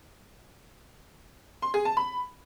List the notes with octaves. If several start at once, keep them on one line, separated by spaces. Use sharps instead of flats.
C6
G#4
A5
B5